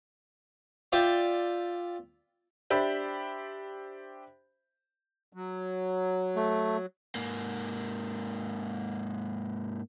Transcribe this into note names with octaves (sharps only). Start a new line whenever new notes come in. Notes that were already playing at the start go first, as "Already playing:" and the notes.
F4 D5 E5 G5
D4 G4 C5 E5 B5
F#3
A3
G#2 A#3